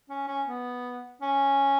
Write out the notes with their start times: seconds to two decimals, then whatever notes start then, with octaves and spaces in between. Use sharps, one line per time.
0.10 C#4
0.28 C#4
0.47 B3
1.22 C#4